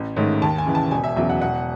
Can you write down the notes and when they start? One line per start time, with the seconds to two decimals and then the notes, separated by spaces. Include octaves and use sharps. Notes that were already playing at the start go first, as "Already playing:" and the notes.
Already playing: A1
0.17 G#2 D#3 A3 C#4
0.42 D#2 A5
0.58 G#5
0.66 C#3 E3
0.75 A5
0.91 E1 G#5
1.04 E5
1.17 E2 C#3 F#3 E5
1.30 F#5
1.41 E1 F#5